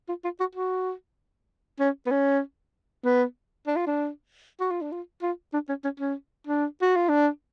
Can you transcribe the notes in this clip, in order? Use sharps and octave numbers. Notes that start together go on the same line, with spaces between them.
F4
F4
F#4
F#4
C#4
B3
C#4
B3
D4
F4
D4
F#4
F4
D4
F4
F4
D4
C#4
C#4
C#4
D4
F#4
F4
D4